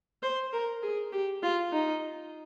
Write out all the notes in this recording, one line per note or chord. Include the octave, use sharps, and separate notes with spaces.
C5
A#4
G#4
G4
F4
D#4